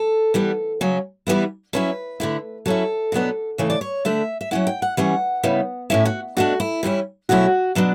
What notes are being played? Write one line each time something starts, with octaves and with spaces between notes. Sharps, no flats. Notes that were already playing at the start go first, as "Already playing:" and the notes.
Already playing: A4
E3 G3 B3
C#3 F#3 C#4
E3 G3 B3 E4
F#3 C#4 E4 B4
D3 A3 E4
F#3 C#4 E4 A4
B2 F#3 B3 D4
C#3 E3 A3 C#5
D5
C#5
D3 A3 D4 E5
E5
F#3 C#4 E4 F#5
G5
F#5
E3 G3 C#4 F#5
C#3 G3 B3 E4
A2 G3 C#4 E4 E5
F#4
B2 A3 D4 F#4
E4
E3 G3 C#4 E4
B2 F#3 A3 C#4 E4 F#4
B2 F#3 B3 D4